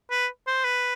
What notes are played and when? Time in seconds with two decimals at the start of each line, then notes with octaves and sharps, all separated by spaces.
0.11 B4
0.47 C5
0.64 B4